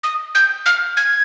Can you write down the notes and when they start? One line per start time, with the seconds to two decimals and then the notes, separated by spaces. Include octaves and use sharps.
0.03 D#6
0.35 G6
0.66 F6
0.97 G#6